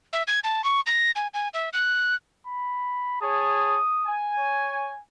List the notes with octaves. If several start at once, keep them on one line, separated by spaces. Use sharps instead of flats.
E5
G#6
A5
C#6
A#6
G#5
G#5
E5
F#6
B5
G#4 C#5 A5 D#6
G#5
C#5